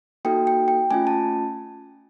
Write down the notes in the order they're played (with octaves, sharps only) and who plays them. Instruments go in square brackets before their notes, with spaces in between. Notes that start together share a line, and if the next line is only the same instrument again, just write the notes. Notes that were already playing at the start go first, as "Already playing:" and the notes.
[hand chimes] A#3 D#4 F#4 A4 G5
G5
G5
A3 C#4 F4 G#5
A5